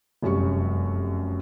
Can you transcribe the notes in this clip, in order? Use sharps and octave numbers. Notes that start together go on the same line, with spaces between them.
F1 F#2 G3 C#6